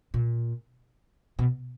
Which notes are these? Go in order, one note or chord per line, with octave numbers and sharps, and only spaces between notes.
A#2
B2